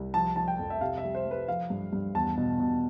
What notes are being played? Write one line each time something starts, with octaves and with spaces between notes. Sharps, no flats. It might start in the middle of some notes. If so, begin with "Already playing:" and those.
Already playing: C2
F3 A5
F3 A5
G5
F2
E5
C3 F5
E5
G3
C5
G3
B4
F3 F5
G2
G2
E2 A5
B2
B2